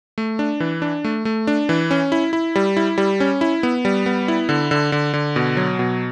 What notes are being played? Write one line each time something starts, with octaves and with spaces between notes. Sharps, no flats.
A3
D4
E3
D4
A3
A3
D4
E3
C#4
E4
E4
G3
E4
G3
C#4
E4
B3
G3
B3
E4
D3
D3
D3
D3
B2
F#3
B2